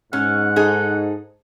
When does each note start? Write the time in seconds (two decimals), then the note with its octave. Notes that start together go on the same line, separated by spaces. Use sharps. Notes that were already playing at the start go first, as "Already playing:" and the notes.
0.13 G#2 C#4 F#5
0.56 D#4 G#4 A4